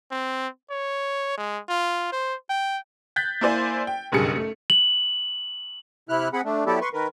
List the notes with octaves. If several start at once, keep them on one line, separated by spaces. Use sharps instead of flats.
C4
C#5
G#3
F4
C5
G5
F#6 G6 A6 B6
A#3 E4 C5 D5 G#5
G5
F#1 B1 G2 G#4 C#7
A3
F#7
C3 E4 F6 F#6
C4 G#4 F#5 B5
A3 D4
F#3 B3 E4 G4 A4 D5
B4 C6 C#6
D#3 A#4 B4